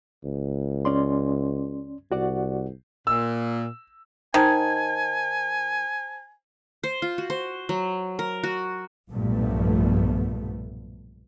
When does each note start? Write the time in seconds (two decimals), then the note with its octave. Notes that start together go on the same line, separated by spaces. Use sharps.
0.25 C#2
0.85 C#4 D5 C6
2.12 C2 F#4 D5 F#5
3.07 A#2 E6
4.34 D#3 C5 G#5 A5 G#6
6.83 C5
7.02 F4
7.18 F#4
7.30 C5
7.69 F#3
8.19 A#4
8.43 F#4
9.11 B1 G2 A#2 F3 A3 B3